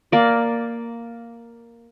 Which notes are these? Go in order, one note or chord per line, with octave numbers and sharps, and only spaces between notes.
A#3 D5